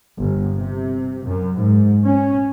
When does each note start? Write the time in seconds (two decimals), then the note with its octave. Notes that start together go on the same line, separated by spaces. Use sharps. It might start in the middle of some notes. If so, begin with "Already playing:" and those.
0.19 G1
0.55 C3
1.25 F#2
1.57 G#2
2.06 C#4